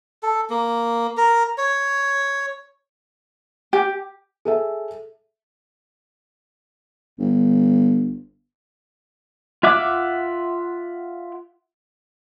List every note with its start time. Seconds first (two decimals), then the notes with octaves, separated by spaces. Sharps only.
0.23 A4
0.50 A#3
1.17 A#4
1.58 C#5
3.73 G4
4.45 G#4 A4 E5
7.19 G1
9.63 F4 E5 F#5 D6